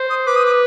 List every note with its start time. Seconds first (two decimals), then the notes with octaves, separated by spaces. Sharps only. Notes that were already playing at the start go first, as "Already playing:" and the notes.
Already playing: C5
0.10 D#6
0.27 B4 D6
0.36 D#6
0.46 D6